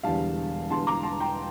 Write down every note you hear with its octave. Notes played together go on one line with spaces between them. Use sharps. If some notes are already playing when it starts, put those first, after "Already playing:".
E1 E2 D3 G3 F5 A5
E1 E2 D3 G3 A5 C6
A#5 D6
A5 C6
G5 A#5